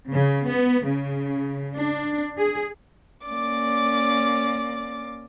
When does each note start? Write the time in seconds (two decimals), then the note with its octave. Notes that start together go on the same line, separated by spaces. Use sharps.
0.10 C#3
0.45 B3
0.83 C#3
1.73 D4
2.38 G#4
3.25 A#3 C#4 D5 D6